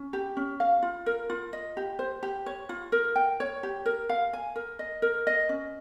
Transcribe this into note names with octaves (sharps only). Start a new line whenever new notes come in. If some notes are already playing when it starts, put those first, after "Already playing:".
Already playing: C#4
G4
C#4
F5
F4
A#4
F4
D#5
G4
C5
G4
C#5
F4
A#4
G5
C#5
G4
A#4
F5
G#5
A#4
D#5
A#4
D#5
C#4